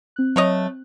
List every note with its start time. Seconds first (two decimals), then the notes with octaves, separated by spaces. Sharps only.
0.16 C4 F#6
0.36 F#3 A3 C#5 D#5